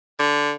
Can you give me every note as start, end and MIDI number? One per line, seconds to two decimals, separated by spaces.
0.20 0.52 50